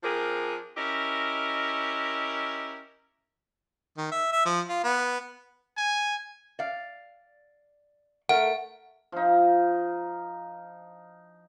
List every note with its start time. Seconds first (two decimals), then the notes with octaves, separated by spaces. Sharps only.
0.03 F3 C4 D4 G#4 A#4
0.77 C#4 E4 G4 A#4 D#5
3.98 D#3
4.12 E5
4.33 E5
4.45 F3
4.69 F4
4.84 B3
5.77 G#5
6.59 D5 F5
8.29 A3 A#4 F#5
9.12 F3 D#4